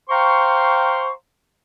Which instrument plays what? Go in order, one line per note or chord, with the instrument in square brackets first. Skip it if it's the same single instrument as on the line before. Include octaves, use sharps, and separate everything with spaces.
[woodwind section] C5 F5 G5 A#5 C6 C#6